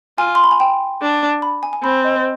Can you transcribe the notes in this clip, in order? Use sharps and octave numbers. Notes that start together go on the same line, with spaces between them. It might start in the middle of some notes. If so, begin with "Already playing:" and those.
F4 G#5
C6
B5
G#5
G5
D4
B5
G#5
G#5
C4 B5
D#5
C5